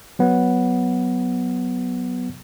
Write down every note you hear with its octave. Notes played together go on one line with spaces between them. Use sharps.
F#3 B3